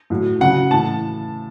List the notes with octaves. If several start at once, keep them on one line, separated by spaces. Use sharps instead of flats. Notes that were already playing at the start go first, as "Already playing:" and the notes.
A2 F#3
C#3 F#3 F#5
A2 E3 A5